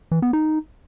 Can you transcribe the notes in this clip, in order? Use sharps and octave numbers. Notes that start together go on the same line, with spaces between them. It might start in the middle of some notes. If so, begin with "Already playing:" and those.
E3
B3
D#4